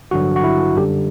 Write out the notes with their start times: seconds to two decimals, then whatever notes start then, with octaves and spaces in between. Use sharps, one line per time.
0.11 A1 G2 D3 F#3 F#4
0.36 F#4
0.44 E4
0.76 F#2 D3 G3 G4